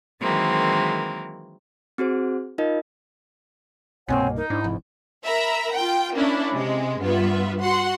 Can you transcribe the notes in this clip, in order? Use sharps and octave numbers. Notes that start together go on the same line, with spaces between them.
D#3 E3 F#3 G#3 A#3 C4
C4 F#4 G#4 C5
D#4 F4 A#4 D#5
C2 G2 B2 A#3 C4 C#5 F#5 G#5
D#4 A#4
G#2 D4 E4
F1 F2
A#4 E5 A#5 B5
F4 G5
A#3 C#4 D4 E4
C3 G#3
G2 B3 F4 B4 E5
F#4 F#5 C6